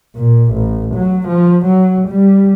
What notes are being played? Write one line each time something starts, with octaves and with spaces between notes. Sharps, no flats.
A#2
A1
F#3
F3
F#3
G3